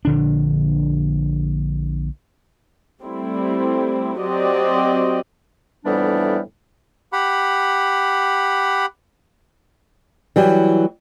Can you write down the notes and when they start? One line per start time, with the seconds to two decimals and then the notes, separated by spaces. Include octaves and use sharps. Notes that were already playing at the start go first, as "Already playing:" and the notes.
0.05 A#1 D3 D4
3.03 G3 A3 C4 E4
4.19 F#3 C4 F#4 G4 D5 D#5
5.85 F2 A2 E3 G3 B3 D4
7.13 G4 F#5 B5
10.36 E3 F#3 G3